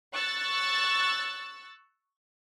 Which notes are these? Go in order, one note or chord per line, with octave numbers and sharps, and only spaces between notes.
C#6 E6 F#6 A6